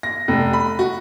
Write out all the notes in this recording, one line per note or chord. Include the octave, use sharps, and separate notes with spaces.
A#6
F1
B5
F#4